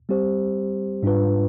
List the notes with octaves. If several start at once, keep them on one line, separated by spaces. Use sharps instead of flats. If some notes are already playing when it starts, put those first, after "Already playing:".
G3 C4 G4 C5
G#2 G3 D4 F4 B4